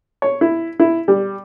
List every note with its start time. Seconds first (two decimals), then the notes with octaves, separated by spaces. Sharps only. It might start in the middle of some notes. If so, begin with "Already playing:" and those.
0.22 C#5
0.41 E4
0.80 E4
1.08 G3